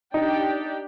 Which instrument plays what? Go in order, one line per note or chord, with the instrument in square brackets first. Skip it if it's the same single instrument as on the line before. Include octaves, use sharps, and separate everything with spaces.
[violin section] D4 G4 D5 G5 [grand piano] D#4